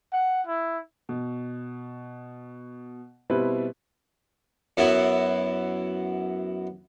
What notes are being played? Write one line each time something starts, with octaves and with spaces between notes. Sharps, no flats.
F#5
E4
B2
B2 G3 C4 E4 B4
F#2 F#3 B3 E4